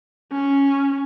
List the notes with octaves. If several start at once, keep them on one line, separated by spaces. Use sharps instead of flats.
C#4